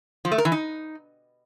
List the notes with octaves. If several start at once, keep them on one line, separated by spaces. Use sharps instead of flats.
F3
A3
A#4
E3
D#4